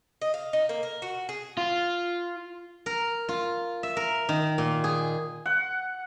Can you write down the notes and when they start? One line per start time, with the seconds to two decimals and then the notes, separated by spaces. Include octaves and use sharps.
0.21 D#5
0.34 F5
0.53 D#4
0.69 A#3
0.83 A#4
1.02 F#4
1.29 G#4
1.57 F4
2.86 A#4
3.29 F4
3.83 E5
3.97 A#4
4.29 D#3
4.58 A#2
4.84 G#4
5.46 F#5